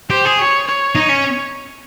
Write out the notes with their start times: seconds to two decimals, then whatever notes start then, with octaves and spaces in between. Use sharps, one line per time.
0.10 G4 C5
0.25 G#4
0.39 C#5
0.67 C#5
0.95 D#4
1.09 C#4